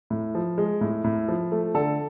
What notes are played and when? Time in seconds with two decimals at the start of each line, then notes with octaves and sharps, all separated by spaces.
0.10 A2
0.35 F3
0.58 G#3
0.81 A2
1.04 A2
1.28 F3
1.52 A3
1.74 D3 A4